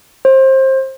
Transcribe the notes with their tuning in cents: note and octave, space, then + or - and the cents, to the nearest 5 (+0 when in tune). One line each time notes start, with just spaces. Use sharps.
C5 +25